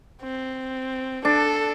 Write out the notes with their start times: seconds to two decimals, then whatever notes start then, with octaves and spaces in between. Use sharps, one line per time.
0.22 C4
1.25 D4 A4